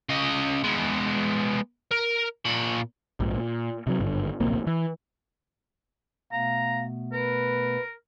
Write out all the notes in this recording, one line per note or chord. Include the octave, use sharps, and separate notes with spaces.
C#3 D#5
G#3 B3
A#4
A#2 B5
A#1 G#2
A#2
C3 F3 F#3
G#1 G2 D3
D1 A#1 C3 A#3
E3
B2 A3 B3 F5 A#5
A#4 B4